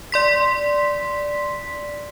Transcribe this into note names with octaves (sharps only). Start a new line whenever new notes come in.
D5 C6 B6